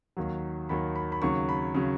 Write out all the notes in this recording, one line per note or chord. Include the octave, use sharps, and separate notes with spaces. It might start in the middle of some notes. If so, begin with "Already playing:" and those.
D#2 D#3 F#3
D#2 D#3 F#3 B5
B5
B5
D#2 C#3 F#3 C#6
B5
C#3 F#3